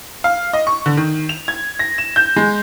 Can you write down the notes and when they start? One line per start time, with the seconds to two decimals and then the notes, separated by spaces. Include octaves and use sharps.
0.24 F5
0.53 D#5
0.67 C#6
0.86 D3
0.97 D#3
1.29 F7
1.48 G#6
1.79 A#6
1.98 E7
2.16 G6
2.36 G#3